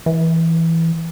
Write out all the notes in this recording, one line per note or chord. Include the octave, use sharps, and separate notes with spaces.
E3